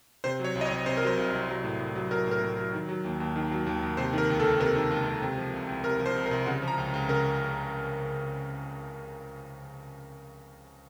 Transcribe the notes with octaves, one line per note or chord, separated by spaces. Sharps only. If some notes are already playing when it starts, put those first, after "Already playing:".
C3 C5
F#3
C#5
C2
D#5
C#5
C2
C3 C5
A#4
F#3 C5
C2
C2
F#3
A2
A2
F#3
F#3 A#4
A2 A#4
A2
F#3
D#3
F#3
D#2
D#2
D#3
F#3
D#2
D#2
C3 C5
D#3
A#4
C#2
A4
C#2
C3 A#4
D#3
C#2
C#2
C3
F3
C2
C2
C3 A#4
F3
C5
C2
A#4
C2
C#3 F#5
F3
A#5
C#2
C#2
C#3 A#4